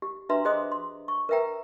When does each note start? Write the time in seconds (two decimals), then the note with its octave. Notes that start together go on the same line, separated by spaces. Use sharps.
0.02 G4
0.29 D4 F#4 B4 E5 A#5 C6
0.45 G#4 C5 D#5 C6 D#6
0.72 C6
1.08 C#6
1.29 A#4 B4 E5 G5 A#5